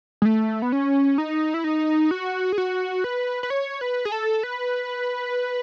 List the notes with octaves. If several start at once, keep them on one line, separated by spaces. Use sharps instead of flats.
G#3
A3
B3
C#4
D#4
E4
D#4
F#4
G#4
F#4
B4
B4
C#5
B4
G#4
A4
B4